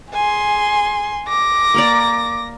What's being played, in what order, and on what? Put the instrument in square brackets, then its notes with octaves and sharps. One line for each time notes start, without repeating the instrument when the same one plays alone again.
[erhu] G#4 [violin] G#5 C6
[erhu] D6 [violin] A#6
[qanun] A#3 A#4 D5